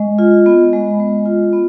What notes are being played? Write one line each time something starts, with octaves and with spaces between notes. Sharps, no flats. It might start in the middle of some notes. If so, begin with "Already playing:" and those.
Already playing: G#3 D#5
F4
B3
G#3
G#3
F4
B3